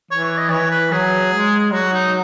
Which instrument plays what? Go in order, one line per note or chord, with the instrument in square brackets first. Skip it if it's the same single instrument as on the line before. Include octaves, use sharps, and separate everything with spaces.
[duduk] E3 [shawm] C#5
[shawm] C#5
D#5
[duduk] E3 [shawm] C#5
[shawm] B4
[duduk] F#3 [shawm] G#4
[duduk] G#3
[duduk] F#3 [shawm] F#4
[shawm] D#4